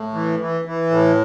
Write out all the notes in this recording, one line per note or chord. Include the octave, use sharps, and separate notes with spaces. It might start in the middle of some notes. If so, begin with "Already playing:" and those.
Already playing: A2
E3
E3
E3
A2